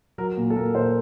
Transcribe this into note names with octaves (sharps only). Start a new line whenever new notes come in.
F#3 A#4
A#2
A4
A#2 A#4
A#2 C5